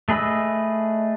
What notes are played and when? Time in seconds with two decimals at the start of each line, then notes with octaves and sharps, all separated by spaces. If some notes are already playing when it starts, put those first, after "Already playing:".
0.09 A3 G#4 B4 D#5 E6